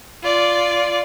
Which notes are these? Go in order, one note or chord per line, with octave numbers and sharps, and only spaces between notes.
F4 D5